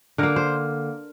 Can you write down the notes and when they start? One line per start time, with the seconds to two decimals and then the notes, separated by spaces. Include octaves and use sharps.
0.18 D3 A#3 A#4
0.36 C5